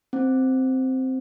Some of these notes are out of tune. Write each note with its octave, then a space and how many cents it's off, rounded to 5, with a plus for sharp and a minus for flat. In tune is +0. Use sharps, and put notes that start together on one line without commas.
C4 -5